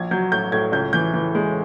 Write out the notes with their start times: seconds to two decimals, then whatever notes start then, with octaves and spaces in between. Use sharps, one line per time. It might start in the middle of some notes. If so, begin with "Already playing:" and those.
Already playing: A#1 G#6
0.11 F#3 G6
0.32 A2 G6
0.52 A2 G#6
0.72 C#2 G6
0.93 E3 G6
1.14 E3
1.35 G#3